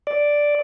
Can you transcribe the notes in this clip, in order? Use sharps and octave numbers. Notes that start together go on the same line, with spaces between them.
D5